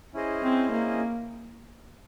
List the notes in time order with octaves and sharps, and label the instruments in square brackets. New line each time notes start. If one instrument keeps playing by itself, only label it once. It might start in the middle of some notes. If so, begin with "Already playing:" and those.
[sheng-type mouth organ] C#4 E4 G#4 C5 D#5
[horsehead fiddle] C4
A#3